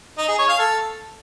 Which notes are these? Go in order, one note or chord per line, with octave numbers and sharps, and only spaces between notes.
D#4
G#4
C#5
F5
A4